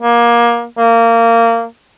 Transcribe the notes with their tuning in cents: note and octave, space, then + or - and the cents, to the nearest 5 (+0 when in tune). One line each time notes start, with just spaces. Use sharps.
A#3 +20
A#3 -20